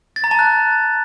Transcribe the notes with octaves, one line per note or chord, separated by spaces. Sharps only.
A6
A#5
A5
F#6